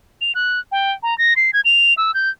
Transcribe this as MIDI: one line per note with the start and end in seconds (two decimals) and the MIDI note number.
0.21 0.32 101
0.35 0.59 90
0.72 0.92 79
1.03 1.17 82
1.18 1.34 94
1.36 1.51 96
1.53 1.61 92
1.65 1.94 101
1.97 2.14 88
2.14 2.30 91